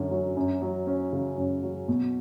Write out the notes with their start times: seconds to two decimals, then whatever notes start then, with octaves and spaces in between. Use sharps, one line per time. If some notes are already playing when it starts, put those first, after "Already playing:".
Already playing: F#2 D3 F#3 C#4
0.11 F#3
0.37 F#2
0.62 F#3
0.87 C#4
1.13 C#3
1.37 F#2
1.63 F#3
1.88 B2